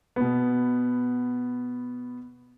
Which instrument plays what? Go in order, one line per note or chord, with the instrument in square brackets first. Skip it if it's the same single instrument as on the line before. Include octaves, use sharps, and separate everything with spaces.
[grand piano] B2 B3